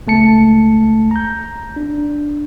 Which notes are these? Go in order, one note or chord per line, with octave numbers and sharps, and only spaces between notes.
C#2 A3 A5 C#7
A#5 G6
D4